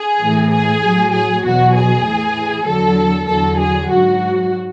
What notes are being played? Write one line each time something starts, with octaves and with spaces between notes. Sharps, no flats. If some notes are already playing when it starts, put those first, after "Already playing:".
Already playing: G#4
A2 E3
G#4
A2 F#3
G#4
E2 B2 F#3 F#4
G#4
A2 E3
E2 D3 F#3 A4
E2 D3 F#3 A4
G#4
G#2 F#3 F#4